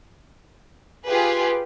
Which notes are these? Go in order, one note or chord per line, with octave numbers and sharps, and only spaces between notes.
F4 G4 G#4 B4